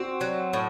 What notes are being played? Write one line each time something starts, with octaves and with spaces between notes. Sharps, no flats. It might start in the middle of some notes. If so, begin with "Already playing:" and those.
Already playing: C4 F#4
F#3
A2